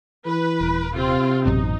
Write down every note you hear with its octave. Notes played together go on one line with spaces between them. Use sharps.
E3 B4
D#1
C3 C4 F4
A1 F#2 B2 D#4